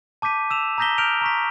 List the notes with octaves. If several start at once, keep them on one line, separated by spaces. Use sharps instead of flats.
A5 D6 G6 B6 D#7
E6 E7 F7
A#5 D#6 G6 A#6 B6 G7
F6 G6 D7 F7
A#5 C#6 B6